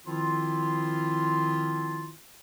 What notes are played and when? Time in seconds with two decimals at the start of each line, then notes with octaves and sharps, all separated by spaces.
0.05 D#3 F3 C4 E4 F4